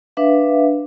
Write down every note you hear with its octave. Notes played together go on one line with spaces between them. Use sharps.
D4 B4 E5 F5